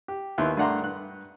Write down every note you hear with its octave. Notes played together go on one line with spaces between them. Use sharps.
G4
D#2 B3 E4 C6
G2 A3 D4 F#5 A#5 C6
G2 F#6